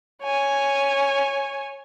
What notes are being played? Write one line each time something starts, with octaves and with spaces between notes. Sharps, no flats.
C#5 G#5